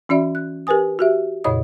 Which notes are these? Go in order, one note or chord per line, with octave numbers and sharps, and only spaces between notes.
E3 C#4 F#4 D5 E5 B5
F#6
G4 A#4 B4 G#5 D#6
F#4 G4 E5
F2 A#2 C#3 C#5 D#5 D#6